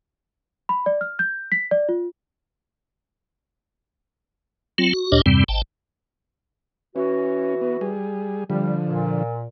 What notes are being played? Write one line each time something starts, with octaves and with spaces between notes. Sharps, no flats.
B5
D5
F6
G6
B6
D5
F4
F#3 C4 F4
F#4
D2 A#2 D4 G4 C#5 D#5
E2 G2 C3 G3 C4
G#1 G5 A5
E3 C#4 F#4
B3
G3 G#4
D3 F3 G3
A#2